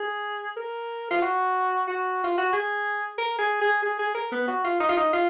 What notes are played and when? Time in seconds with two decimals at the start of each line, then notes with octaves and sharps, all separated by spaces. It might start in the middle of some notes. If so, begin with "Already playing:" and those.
Already playing: G#4
0.57 A#4
1.11 F4
1.22 F#4
1.88 F#4
2.24 F4
2.38 F#4
2.53 G#4
3.18 A#4
3.39 G#4
3.61 G#4
3.82 G#4
3.99 G#4
4.15 A#4
4.32 B3
4.48 F#4
4.65 F4
4.80 D#4
4.89 F4
4.97 D#4
5.13 F4